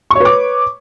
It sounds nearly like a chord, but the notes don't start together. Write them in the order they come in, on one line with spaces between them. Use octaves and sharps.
C#6 C#5 B4 D6